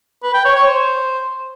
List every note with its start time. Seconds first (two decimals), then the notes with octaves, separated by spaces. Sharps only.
0.23 B4
0.34 G5
0.45 C#5
0.56 C#5
0.67 C5